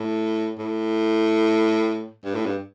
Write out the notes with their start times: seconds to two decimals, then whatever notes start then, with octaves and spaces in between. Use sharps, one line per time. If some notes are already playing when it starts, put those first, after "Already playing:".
Already playing: A2
0.59 A2
2.25 G2
2.35 A2
2.46 G2